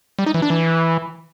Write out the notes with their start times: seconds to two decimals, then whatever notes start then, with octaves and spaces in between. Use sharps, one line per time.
0.19 G3
0.26 D#4
0.34 E3
0.42 D4
0.50 E3